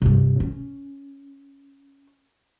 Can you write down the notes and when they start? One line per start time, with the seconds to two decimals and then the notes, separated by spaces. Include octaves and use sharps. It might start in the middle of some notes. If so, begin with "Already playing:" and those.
0.02 G2 C3
0.40 C#4